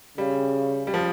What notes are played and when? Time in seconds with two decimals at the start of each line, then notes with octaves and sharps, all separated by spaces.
0.18 C#3 G3
0.87 G3
0.94 F3